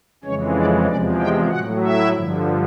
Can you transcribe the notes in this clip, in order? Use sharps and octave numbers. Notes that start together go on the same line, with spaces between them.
F2 C#3 E3 G#3 C#4 C#5
D4 D5
E2 C3 F3 G#3 D4 D5
G4 G5
A2 F#3 F#4 F#5
E4 E5
G2 D3 F3